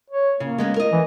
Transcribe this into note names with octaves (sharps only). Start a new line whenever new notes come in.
C#5
C#3 A#3
G#3 B3 C#4
A#4 D#5
E3